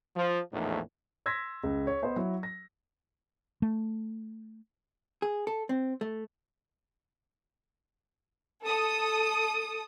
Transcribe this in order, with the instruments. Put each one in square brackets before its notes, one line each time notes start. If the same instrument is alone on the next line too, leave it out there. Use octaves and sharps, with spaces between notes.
[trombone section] F3
A#1 E2 A2 A3 D#4
[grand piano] C6 E6 G#6 A#6 B6
C#2
C#5
B3 C5 D#5
F#3 E4
A#6
[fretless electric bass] A3
[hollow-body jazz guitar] G#4
A4
C4
A3
[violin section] A4 D#6